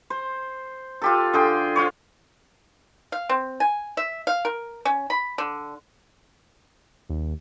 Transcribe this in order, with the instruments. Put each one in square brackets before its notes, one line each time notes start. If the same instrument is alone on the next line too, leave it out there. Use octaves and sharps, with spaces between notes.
[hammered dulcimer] C5
F4 G4 A4
D3 G#4 G5 C6
F4 C5 C#5
[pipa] F5
C4
G#5
E5
F5
A#4
C#4
B5
D3
[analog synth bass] D#2